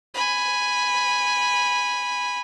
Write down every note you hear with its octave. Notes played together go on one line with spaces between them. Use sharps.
G#5 B5